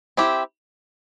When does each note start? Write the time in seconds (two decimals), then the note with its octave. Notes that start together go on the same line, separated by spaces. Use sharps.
0.17 C4 E4 G4